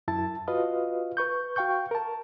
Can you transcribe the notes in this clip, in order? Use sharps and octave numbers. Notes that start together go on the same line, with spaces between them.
F#2 E4 A5 A6
F4 F#4 B4 D#5 F5
B4 C#6 G6
F#4 F5 G5 C#6 G6
A#4 A5